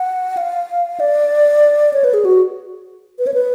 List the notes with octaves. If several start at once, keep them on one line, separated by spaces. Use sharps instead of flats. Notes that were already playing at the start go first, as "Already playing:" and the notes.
Already playing: F#5
F5
D5
C#5
B4
G#4
F#4
B4
C#5
B4